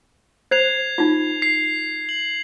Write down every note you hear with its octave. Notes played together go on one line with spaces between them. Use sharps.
C5 G#6 C7 F7
D#4 F4
C7
F#7